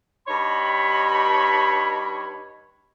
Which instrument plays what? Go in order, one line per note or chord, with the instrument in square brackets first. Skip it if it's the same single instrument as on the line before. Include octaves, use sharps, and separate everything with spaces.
[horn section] G2 D#4 C#5 B5